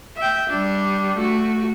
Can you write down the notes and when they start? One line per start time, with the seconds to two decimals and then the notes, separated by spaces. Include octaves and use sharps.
0.17 E5 G5
0.50 G3 D4
1.16 A3 F#4